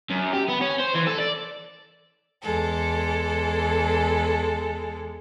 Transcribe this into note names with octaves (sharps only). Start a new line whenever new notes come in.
F#2
G4
B3
C#4
C5
E3
A4
D5
E2 G#3 A4